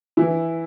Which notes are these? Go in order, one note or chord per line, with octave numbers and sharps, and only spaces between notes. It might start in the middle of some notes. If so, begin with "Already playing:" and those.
E3 E4